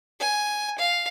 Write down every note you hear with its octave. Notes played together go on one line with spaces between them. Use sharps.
G#5
F5